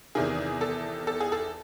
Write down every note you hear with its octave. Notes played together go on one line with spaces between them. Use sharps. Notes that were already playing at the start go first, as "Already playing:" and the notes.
E2 C3 D#3 G#4
A4
A4
G#4
A4